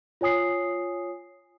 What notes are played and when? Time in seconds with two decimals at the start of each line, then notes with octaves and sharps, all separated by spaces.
0.21 F4 C#5 G#5 D#6 C7